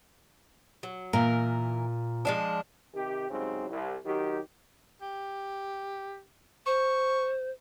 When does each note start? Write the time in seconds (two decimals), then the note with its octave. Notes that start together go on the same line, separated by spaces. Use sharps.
0.83 F#3
1.13 A#2 E3 A#4
2.25 F3 G#3 D4
2.94 C3 D#3 G4
3.30 G#2 C#3 F#3 G3 C4
3.69 C2
4.06 D#3 F#3 G4
5.02 G4
6.66 C5 C#6